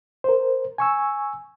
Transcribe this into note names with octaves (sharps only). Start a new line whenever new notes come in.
A#4 C5
G#5 C#6 E6